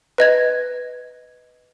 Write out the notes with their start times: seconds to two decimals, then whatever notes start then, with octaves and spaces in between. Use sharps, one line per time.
0.18 B4 D#5 G#6